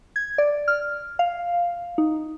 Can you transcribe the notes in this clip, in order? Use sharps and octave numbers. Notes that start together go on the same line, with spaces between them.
G#6
D5
F6
F5
D#4